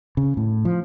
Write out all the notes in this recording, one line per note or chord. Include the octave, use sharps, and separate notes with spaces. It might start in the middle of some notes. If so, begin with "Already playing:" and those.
C#3
A2
F3